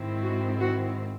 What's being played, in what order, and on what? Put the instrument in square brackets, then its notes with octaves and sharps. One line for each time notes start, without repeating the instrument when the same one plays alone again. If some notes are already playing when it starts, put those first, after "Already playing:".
Already playing: [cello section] G#2 D#3 G#3 C4 E4
F#4
F#4